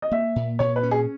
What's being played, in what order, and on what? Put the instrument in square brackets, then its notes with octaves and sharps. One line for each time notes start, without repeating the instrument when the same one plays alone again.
[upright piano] D#5
[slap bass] A#3 [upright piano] E5
[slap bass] A#2
[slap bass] A#2 [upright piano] C#5
[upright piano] B4
[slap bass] C#4
[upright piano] G#4